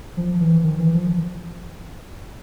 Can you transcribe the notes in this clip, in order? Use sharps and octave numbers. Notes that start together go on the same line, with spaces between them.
F3
E3
D#3
E3
F3